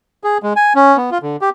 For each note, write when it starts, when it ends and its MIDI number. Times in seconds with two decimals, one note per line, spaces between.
0.24 0.38 68
0.43 0.53 56
0.56 0.73 80
0.75 0.97 61
0.97 1.10 59
1.11 1.18 65
1.23 1.36 50
1.41 1.50 67